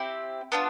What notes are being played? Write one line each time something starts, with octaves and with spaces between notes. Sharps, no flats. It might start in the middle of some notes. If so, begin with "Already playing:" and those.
Already playing: C4 E4 G4
B3 D4 F4